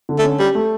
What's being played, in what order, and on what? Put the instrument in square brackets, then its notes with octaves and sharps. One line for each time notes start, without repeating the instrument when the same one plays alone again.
[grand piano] D3
[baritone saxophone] A3
[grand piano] C#4
[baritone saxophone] G3 [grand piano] G4
[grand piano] A3